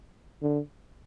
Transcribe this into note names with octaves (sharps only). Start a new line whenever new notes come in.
D3